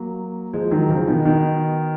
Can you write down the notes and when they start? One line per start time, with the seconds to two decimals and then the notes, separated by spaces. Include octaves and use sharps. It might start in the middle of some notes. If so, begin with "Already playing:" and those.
Already playing: F#3 A#3
0.53 F3 G#3
0.71 D#3 F#3
0.89 C#3 F3
1.08 B2 D#3
1.25 B2 D#3